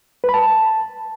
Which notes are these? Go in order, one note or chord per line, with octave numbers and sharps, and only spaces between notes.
B4
B5
A5